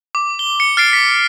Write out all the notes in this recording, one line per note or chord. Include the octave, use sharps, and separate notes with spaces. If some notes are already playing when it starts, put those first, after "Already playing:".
D6
G7
C#7
F6 A6 C7 D7
B6